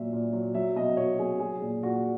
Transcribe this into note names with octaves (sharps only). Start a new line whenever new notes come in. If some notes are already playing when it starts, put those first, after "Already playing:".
Already playing: A#2 F#3 E5
A#2
F#3
F#3 E5
B2 D#5
B2 C#5
F#3 G#4
F#3 G#4
A#2
A#2 F#4